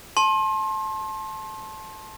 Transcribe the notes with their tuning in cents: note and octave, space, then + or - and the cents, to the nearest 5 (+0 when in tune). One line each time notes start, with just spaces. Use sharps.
A5 -15 C6 +30